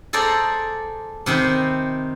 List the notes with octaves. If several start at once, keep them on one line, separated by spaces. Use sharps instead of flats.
G#4 A4 C5 D5 A#5
C3 D#3 C4 B5